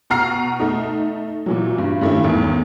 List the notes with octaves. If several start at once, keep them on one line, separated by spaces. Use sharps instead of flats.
B2 F#5 A#5 F6 C7
A3 D#4
A#2 E3 F#3
G2
G2 D#3 A3 C#4 E4
G#1 E2 A2 D#3